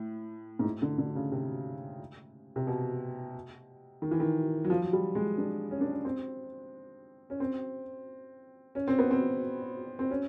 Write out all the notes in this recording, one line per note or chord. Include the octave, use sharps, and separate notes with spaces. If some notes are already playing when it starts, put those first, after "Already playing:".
Already playing: A2
G#2
A2
D3
D3
C#3
C3
C3
B2
D#3
E3
D#3
F#3
F3
F#3
G3
G#3
D4
C#4
D4
C#4
C4
C#4
C4
C#4
C4
B3
C4
C4
C#4